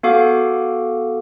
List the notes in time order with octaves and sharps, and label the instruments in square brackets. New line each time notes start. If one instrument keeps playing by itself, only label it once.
[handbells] B3 F#4 A4 F5 D6